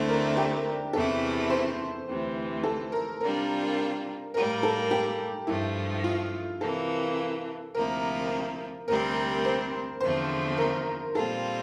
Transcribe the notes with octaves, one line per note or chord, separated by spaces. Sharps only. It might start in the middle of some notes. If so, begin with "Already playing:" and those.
Already playing: D2 D3 A3 C4 D4 E4
A#4
G4
E2 C3 E3 A3 E4 A4
C5
D2 C3 E3
A4
A#4
C3 G3 D4 F4 A#4
A2 G3 A#3 A#4
A4
G4
G2 F3 A3 E4
F4
C3 E3 A#3 A4
D2 C3 F3 A#3 E4 A#4
D2 C3 G3 C4 A#4
C5
E2 D3 F3 A3 C4 C5
A#4
A#2 G3 C4 F4 A4